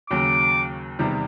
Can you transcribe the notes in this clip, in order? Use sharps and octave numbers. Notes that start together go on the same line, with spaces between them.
D#2 C#3 F#3 D6
E2 C3 D#3 G3